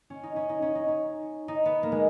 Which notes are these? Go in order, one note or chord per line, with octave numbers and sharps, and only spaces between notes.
C#4
D#4
C#4
D#4
C#4
D#4
C#4
D#4
B3
A#3
G#3